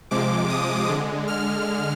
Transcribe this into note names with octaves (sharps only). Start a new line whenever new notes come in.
C3 F3 G#3 D6
D#6
D3 G#3
F6